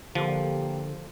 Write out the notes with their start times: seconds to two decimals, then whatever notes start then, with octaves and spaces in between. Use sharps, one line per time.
0.15 A#2 D3 F3 A#3 G4